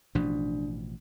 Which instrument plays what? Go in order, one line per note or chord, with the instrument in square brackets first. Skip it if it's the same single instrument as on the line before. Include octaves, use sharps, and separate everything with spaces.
[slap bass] A1 B2 F3 [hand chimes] D4